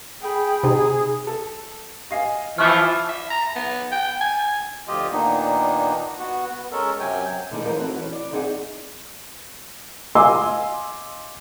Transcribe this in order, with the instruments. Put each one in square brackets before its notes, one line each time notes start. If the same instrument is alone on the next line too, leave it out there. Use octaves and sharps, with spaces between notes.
[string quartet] G#4 G5 B5
[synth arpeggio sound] C3 D#4 [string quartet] G#4
[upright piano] A4
D#5 F5 G#5
[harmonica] E3 F3 E5 [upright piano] C#6 F#6 [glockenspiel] F6
[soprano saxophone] E5
A#5
B3
G5
G#5
[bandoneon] D2 F3 F4 G4 D#5
A#2 D#3 A#3 B3 D4 D#4
B3 F#4
B3
G#3 C#4 A4 A#4
F#2 C3 F#3 G5 G#5
[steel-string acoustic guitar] D3 D#3 G#3 D#4 E4
E3 F3 D#4 A#4 C5 C#5
C4 F#4 A4
E3 C#4
D5
F#2 C4 D#4 G#4 D5 F#5
[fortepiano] D#5 F5 G#5 C6 D6 E6